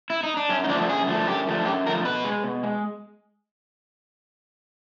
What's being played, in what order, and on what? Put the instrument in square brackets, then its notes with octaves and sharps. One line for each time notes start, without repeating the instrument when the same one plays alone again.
[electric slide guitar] E4
D#4
D4
F#2 C#4
D#4
D3 F3 A3 D4
F#2 G#4
D3 F3 A3
F#2 G4
D3 F3 A3
F#2 G4
D3 F3 A3 A#4
B2 B4
G#3
B2
G#3